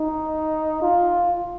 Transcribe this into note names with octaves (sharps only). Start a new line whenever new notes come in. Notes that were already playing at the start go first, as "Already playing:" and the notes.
Already playing: D#4
F4